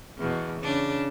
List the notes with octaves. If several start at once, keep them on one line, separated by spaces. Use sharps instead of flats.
E2 B2
C#3 D4